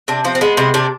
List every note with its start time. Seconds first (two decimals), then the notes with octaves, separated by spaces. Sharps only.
0.08 C3 D4
0.24 F3 C4
0.35 C4
0.41 G#3 B3
0.57 C3 B3
0.74 C3 D4